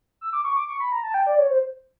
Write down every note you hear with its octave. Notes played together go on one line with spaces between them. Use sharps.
E6
D6
C#6
D6
C#6
B5
A#5
A5
G5
D5
C#5
C5